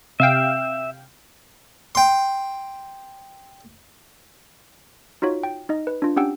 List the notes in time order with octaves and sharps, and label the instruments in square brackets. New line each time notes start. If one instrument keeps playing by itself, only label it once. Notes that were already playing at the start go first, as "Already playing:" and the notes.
[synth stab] C3 F5 G5 [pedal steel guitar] E5
[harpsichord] G5 C6
[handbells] D#4 F4 F#4 C#5
G5
D#4 D#5
B4
D4 F4
C#4 D4 G4 F#5 G5 E6